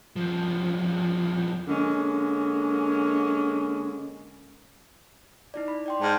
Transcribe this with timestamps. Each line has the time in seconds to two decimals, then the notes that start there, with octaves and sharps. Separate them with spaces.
0.16 D#2 F3
1.68 D3 G#3 A#3 C#4
5.54 D#4 E4 D5
5.68 B5
5.86 D5 G5 C6
6.02 G#2 A5 F6 G6